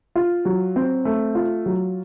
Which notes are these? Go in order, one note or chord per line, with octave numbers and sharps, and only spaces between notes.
F4
F#3
C4
A3
F4
F#3